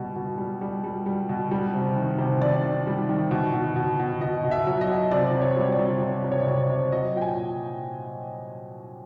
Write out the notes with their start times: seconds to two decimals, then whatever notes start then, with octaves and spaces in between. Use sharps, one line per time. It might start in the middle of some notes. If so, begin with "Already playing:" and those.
Already playing: B2 G3
0.16 B2
0.38 G3
0.61 G3
0.84 G3
1.06 G3
1.29 B2
1.51 G3
1.74 C3
1.96 D#3
2.18 C3
2.41 D#3 D5
2.64 D#3
2.87 G3
3.09 D#3
3.31 B2
3.54 B2
3.76 B2
3.99 B2
4.21 B2 D#5
4.44 B2
4.51 E5
4.67 F#3
4.81 D#5
4.90 F#3
5.11 C3 D5
5.35 C3
5.42 C#5
5.57 G3
5.72 D5
5.79 C3
6.02 C3
6.24 C3
6.32 C#5
6.40 D5
6.47 C3 C#5
6.62 D5
6.69 C3
6.92 F#3 D#5
7.15 A#2 G5
7.21 G#5